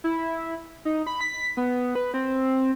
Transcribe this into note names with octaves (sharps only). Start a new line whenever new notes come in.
E4
D#4
B5
B6
B3
B4
C4